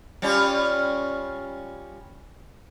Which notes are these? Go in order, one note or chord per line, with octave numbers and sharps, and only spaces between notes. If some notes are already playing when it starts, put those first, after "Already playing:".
G3 C#4 F4